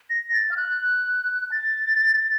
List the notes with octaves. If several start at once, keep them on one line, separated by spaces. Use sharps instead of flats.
A#6
A6
F6
F#6
A6